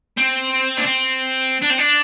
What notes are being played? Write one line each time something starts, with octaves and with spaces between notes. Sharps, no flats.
C4
D4
C4
D4
C4
D4